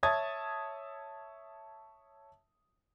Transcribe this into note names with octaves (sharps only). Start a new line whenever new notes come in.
C#5 E5 A5 D#6 G#6 A6